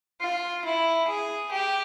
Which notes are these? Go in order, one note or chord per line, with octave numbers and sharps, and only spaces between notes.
F4
E4
G#4
G4